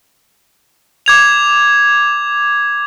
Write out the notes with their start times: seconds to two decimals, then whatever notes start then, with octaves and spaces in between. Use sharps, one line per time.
1.06 D6 G#6 F7